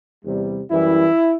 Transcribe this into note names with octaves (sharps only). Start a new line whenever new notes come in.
E2 C3 G3
F#2 E3 G3 E4